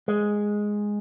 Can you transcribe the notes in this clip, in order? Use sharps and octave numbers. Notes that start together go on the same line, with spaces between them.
G#3